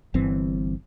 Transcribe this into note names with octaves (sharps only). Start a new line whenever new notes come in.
G1 G2 E3 C4